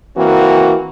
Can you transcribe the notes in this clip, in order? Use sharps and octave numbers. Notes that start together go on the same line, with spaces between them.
E3 A#3 C4 F#4